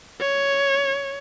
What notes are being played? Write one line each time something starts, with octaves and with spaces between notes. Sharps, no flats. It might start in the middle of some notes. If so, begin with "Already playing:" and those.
C#5